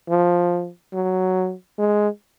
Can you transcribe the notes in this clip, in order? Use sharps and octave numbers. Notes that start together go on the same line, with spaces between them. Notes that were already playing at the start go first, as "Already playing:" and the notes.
F3
F#3
G#3